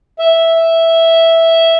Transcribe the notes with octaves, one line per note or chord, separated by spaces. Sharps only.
E5